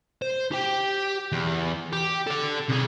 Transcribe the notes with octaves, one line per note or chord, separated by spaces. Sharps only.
C5
G4 G5
E2
G4
A4 D5
C3 G#4